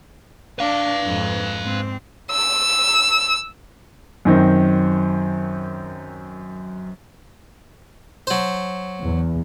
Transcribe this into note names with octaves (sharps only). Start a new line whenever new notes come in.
D4 B4 F5
F2 G#2
G#2 C4
E6
F#2 D#3 C4
F#3 C5
E2